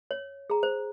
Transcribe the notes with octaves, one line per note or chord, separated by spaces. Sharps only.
C#5
G#4 A#5
C5